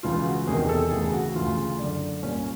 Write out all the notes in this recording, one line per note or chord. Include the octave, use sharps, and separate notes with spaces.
C#2 C#3 E3 F4
F#4
E2 C3 D#3 G#4
G#4
A4
D2 C#3 E3 G#4
F#4
D2 C#3 E3 F4
F#2 D3 D4
C2 A#2 C#4